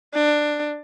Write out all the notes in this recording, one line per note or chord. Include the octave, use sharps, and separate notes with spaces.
D4